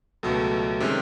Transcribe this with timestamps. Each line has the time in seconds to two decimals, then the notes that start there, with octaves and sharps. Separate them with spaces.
0.23 C#2 B2 F#3 A3 A4
0.80 C3 D#3 G#3 C#4